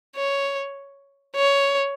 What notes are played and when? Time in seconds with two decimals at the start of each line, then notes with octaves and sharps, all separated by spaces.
0.16 C#5
1.36 C#5